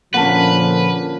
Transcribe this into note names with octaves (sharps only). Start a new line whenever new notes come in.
A#2 D3 F3 A#3 C#4 B4 F#5 A5